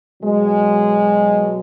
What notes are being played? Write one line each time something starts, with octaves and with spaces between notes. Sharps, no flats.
B2 F#3 G#3